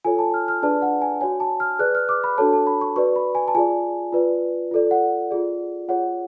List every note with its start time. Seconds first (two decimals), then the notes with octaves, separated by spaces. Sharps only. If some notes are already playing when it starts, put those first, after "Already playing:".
0.05 F4 A4 C#5 G#5
0.19 A5
0.34 F6
0.48 F6
0.62 D4 G#4 B4 D5 A5
0.82 F#5
1.02 G#5
1.21 F#4 C#5 G#5
1.40 A5
1.60 F6
1.79 G#4 B4 D5 F#6
1.95 F6
2.09 D6
2.24 B5
2.38 D4 F#4 A4 C#5 A5
2.53 A5
2.67 B5
2.81 C#6
2.96 F#4 B4 D5 C#6
3.16 B5
3.35 G#5
3.48 A5
3.55 F4 G#4 D5 G#5
4.13 F4 B4 D5
4.71 F4 A4 D5
4.91 F#5
5.30 F4 G#4 D5
5.88 F4 G#4 C#5 F#5